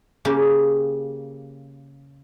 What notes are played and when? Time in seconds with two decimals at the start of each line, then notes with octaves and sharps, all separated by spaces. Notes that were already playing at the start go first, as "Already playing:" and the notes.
0.25 C#3 A#3 G4